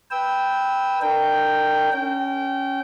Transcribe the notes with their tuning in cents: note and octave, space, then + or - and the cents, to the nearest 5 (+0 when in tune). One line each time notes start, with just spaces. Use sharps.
B4 +0 G5 +0 E6 -20
D4 +35 A#4 -30 G5 +0
C#4 +0 G5 -25